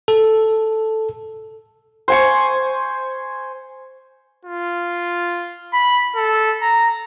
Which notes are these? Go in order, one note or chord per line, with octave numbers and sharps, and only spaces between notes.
A4
C5 G#5 C#6
F4
B5
A4
A#5